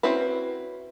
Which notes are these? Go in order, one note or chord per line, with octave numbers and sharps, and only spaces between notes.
C4 C#4 E4 F#4 B4